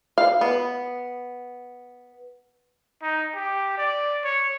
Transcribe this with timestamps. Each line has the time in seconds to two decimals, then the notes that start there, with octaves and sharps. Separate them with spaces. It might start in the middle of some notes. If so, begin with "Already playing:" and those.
0.18 F5
0.41 B3
3.02 D#4
3.35 G4
3.77 D5
4.24 C#5